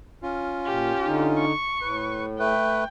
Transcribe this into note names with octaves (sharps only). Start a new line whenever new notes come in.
C#4 F4
A#2 G4
D3 D#4
C#6
A2 B4
A3 B4 G5